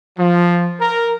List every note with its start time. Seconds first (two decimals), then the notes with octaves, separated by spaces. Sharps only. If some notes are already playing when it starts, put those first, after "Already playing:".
0.19 F3
0.81 A#4